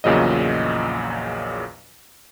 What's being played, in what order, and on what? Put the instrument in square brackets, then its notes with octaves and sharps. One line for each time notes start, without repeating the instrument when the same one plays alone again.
[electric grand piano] A#1 E2 A#2 C#3 F#3 D#5